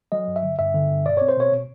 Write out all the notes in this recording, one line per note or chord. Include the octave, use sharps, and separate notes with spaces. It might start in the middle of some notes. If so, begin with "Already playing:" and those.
F#3 D#5
G2
E5
D3
G2 E5
D3
G2
B2 D5
C4 C#5
C5
B2 C#5
B2